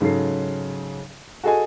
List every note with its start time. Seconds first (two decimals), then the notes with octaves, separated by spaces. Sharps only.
0.01 G#2 C#3 F#3 A4 C7
1.44 F#4 G#4 A4 D#5 G#5